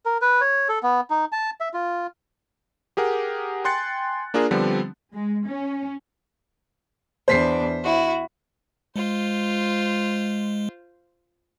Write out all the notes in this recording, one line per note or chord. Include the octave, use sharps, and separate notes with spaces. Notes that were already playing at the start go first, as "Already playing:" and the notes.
A#4
B4
C#5
A4
B3
D#4
A5
E5
F4
G4 G#4 A#4 F#5
G5 G#5 C6 F#6 A6 C#7
A#3 D4 F4 G#4 A#4
D3 F3 G3 B3 C4 D4
G#3
C#4
E2 D4 C5 B6 C7
E4 F#4
G#3 F4 C5